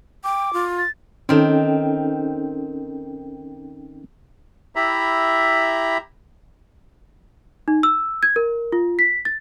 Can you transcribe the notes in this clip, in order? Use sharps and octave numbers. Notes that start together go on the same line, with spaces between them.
G5 D6
F4
A6
D#3 C4 C#4 D#4 A4
E4 G4 E5 A#5 B5
D#4
E6
G#6
A#4
F4
B6
A6